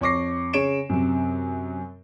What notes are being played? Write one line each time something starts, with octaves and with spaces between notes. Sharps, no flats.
F2 C#5 C#6 D6 A#6 C7
C#3 C#5 D7 E7
F#2 C3